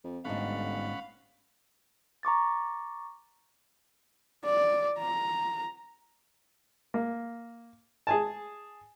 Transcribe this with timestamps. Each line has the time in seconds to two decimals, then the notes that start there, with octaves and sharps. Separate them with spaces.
0.04 F2
0.25 G1 G#2 A3 C#4 F5 F#5 B5
2.23 A#5 C#6 D6 A6
4.45 D5
4.99 A#5
6.94 A#3
8.07 G#4 G#5 A5